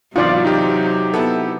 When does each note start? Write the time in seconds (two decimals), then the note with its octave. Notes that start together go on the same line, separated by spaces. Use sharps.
0.16 E2 G#2 C3 F#3 F4 D5 F5
0.45 D#4 G4
1.14 B3 E4 A4